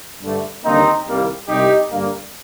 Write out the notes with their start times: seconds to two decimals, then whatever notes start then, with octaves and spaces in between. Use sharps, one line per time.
0.22 G2 D3 A3
0.64 D#2 D3 G3 A#3 C4 D#4
1.06 C2 C3 D#3 G3 A#3
1.48 C2 C3 G3 D#4 G4
1.91 G2 D3 G3 A#3